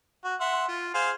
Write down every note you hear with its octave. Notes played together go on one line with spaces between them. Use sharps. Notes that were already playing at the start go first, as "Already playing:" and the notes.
F#4
E5 F#5 C6
F4
G#4 C5 F5